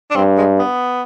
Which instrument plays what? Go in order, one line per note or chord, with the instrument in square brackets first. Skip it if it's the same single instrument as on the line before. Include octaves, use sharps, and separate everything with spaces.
[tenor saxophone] D4
[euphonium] G2 [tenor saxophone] C4
[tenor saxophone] G#3
B3